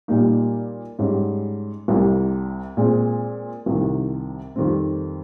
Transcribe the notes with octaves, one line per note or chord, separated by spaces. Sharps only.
A#2 G3 A#3 D#4
G#2 G3 C#4
C2 C3 G3
A#2 G#3 C4
C2 C3 D#3
F2 D#3 G3 C4